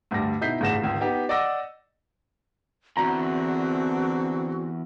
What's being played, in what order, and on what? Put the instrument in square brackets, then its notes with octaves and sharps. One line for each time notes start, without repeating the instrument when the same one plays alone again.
[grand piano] D2 G2 G3 A#6
B2 D#4 E4 G6 B6 C7
A1 G2 C#3 F#5 A#6 E7
G#1 C#2
B3 D#4 G4
D5 D#5 F#5 E6 A#6
[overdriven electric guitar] E2 [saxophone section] D3 C4 [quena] F#4 [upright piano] A#5